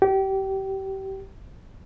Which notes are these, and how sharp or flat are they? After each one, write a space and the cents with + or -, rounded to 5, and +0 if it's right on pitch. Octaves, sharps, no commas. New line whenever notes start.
G4 -25